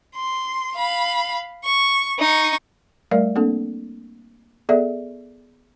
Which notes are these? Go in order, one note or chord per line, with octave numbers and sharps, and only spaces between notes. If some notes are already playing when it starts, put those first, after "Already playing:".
C6
F5 B5
C#6
D#4 C#6
G3 A3 A#4 D5 F5
A#3 C4 D4 A4
B3 G#4 A4 D5 E5